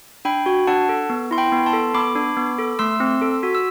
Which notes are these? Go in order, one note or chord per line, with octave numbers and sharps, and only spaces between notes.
D4 G5 B5
F#4
D4 F#5 A5
A4
B3
E4 C6
G5 B5
B3
A5 C6
A4
B3 B5 D6
D4
B3
A4
A3 C6 E6
C4
A4
F#4
E6